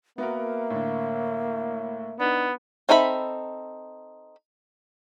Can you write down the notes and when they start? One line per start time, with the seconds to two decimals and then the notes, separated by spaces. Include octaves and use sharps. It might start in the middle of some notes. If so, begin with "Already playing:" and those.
0.18 A#3 B3 F#4 A#4 E5
0.70 A2 D3
2.20 B3 D4 D#4
2.89 C4 D#4 A4 E5 B5